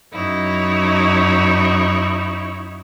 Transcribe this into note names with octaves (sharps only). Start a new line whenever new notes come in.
F#2 D#4 E4 C#5